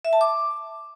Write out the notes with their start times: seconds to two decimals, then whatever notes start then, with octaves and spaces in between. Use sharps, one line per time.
0.05 E5
0.13 A5
0.21 D6